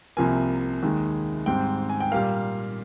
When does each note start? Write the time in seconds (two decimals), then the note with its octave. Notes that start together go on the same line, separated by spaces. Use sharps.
0.17 C2 C3 F3 A#3 G#5
0.83 D#2 D#3 G#3
1.46 G#2 G3 C4 G5
1.89 G#5
2.00 G5
2.11 A#2 G3 A#3 F5